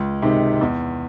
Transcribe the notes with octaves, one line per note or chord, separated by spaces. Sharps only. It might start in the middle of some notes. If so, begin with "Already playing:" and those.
Already playing: C#2
C3 D#3 G#3 D#4
E2